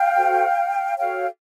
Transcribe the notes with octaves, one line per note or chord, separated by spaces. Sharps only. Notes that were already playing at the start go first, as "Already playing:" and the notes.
Already playing: F5 G5
F#4 A4 C5
F#4 A4 C#5 F5 G5